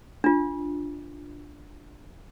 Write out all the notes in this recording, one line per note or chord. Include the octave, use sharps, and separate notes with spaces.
D4 F4